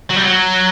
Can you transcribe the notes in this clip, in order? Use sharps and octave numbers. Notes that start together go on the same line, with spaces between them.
F#3
G3
F#3